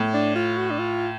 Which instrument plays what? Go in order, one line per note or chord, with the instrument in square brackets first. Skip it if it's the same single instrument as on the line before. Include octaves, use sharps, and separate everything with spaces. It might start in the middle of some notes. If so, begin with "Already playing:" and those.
Already playing: [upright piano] A2
[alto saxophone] D4
F4
F#4
D4
F4